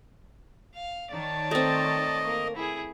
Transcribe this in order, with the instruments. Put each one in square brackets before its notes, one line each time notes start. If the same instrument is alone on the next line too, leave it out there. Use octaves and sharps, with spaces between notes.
[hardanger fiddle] F5
[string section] D#3 C#5 [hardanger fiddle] D5 A5
[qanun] A3 C4 [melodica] D#5
[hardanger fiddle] A#3 A#4
E4 G#4